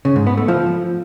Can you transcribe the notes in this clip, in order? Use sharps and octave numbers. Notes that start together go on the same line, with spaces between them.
C#3
G#2
B3
A3
F3